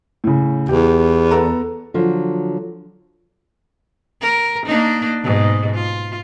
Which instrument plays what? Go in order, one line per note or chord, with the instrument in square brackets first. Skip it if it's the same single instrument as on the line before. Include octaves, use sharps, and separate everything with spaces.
[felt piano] A2 C#3
[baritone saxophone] E2 [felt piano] G4
[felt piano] B3 A4 A#5
[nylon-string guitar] D3 F3 F#3
[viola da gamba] A#4
A#3 D4 D#4
G#2 B2
F4